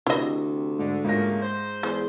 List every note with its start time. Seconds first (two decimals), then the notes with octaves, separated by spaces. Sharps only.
0.07 D2 C3 E4 D#5
0.79 G#2 D3
1.05 G#2 C#3 A3 A#3 F4 A#6
1.43 C5
1.83 E2 G#3